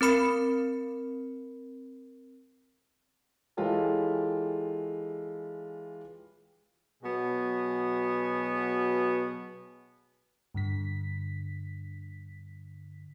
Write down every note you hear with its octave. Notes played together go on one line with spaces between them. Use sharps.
C4 A#4 B5 C#7
E3 G#3 F4 G4 A4 C#5
B2 F#3 B3 F#4 G#4
G2 D3 B6